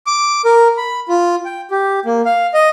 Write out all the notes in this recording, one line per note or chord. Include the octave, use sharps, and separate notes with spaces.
D6
A#4
B5
F4
G5
G4
A#3
F5
D#5